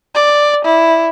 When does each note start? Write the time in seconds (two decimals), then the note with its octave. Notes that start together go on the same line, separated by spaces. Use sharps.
0.15 D5
0.65 E4